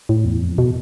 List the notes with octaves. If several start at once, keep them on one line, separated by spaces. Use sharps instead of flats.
A2
E2
F2
B2